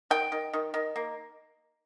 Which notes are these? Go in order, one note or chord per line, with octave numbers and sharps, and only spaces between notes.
D#3 G5
D#3
D#3
D#3
A#3